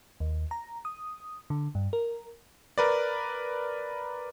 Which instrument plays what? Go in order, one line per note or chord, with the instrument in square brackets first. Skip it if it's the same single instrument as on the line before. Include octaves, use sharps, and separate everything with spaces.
[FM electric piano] D#2
A#5
D#6
D3
G2
A#4
[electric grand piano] A#4 B4 D5